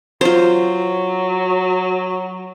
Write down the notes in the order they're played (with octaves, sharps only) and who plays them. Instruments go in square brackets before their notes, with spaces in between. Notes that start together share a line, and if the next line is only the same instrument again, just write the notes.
[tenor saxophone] F#3 [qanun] F4 C5